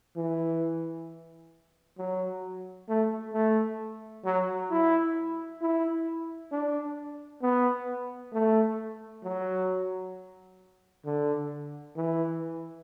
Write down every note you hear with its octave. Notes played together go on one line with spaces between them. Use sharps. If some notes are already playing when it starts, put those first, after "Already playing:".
E3
F#3
A3
A3
F#3
E4
E4
D4
B3
A3
F#3
D3
E3